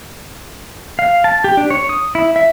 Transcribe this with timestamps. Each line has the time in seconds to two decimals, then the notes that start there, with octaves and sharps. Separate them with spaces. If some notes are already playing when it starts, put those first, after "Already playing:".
0.99 F5
1.24 A5
1.44 G4
1.57 D4
1.70 C#5
1.89 D#6
2.15 E4
2.36 E5